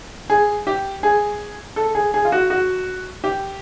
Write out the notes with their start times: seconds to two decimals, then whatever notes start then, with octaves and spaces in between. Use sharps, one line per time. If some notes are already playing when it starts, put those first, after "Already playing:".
0.30 G#4
0.67 G4
1.03 G#4
1.76 A4
1.95 G#4
2.14 G#4
2.25 F4
2.32 F#4
2.50 F#4
3.24 G4